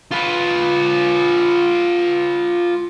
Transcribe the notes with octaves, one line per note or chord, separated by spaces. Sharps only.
F4 B4